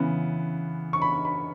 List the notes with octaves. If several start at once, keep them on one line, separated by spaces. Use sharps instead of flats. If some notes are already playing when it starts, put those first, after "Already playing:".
Already playing: C#3 E3 B3
C#6
B5
B5